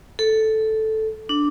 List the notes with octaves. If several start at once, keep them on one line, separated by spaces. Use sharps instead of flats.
A4
D4